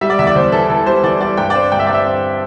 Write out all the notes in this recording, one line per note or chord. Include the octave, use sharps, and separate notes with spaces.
G3 E5
D5
E2 E5
D5
E2 C5
E3 A4
E3 A4
G3 C5
E3 D5
G3 D5
G2 G5
D5
C4 C5
G2 G5
E5
G2 D5
E5
C4